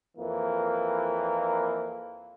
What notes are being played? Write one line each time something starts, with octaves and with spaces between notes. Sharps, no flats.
F2 E3 A#3